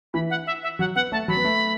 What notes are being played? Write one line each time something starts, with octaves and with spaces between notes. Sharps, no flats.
E3 B5
F#5
E5
E5
F#3 F#5
B3 F#5
A3 A5
F#3 B5
B3
A3